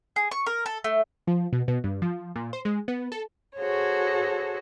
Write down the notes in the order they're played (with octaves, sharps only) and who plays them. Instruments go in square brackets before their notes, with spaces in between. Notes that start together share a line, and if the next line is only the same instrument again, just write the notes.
[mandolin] G#4
C#6
A#4
A4
A3
[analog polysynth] F3
B2
B2
G2
F3
A#2
C5
G#3
B3
A4
[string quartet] F#4 G#4 A4 C5 C#5